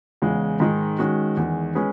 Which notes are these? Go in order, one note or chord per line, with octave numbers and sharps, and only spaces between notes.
E2 C#3 G#3
G#2 D#3 G#3 D#4
D#3 G#3 C#4 F#4
E2 D#3 G#3
G#3 C#4 G#4 B4